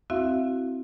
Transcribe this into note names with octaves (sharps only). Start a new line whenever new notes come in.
C4 E4 F#4 E5 F5